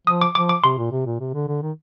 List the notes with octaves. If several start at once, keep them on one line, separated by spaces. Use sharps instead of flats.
F3 D#6
D6
F3 D6
D6
C3 C6
A#2
C3
A#2
C3
D3
D3
D#3